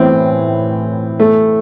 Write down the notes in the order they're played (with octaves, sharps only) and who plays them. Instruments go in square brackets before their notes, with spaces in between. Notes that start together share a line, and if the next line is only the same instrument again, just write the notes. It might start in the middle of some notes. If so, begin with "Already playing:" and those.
Already playing: [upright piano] A2 E3 [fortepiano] C4
[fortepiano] A3